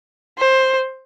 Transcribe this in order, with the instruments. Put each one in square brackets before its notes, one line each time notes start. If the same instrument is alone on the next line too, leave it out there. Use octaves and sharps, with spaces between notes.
[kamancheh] C5